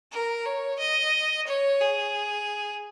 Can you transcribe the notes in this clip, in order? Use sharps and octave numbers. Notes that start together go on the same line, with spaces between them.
A#4
C#5
D#5
C#5
G#4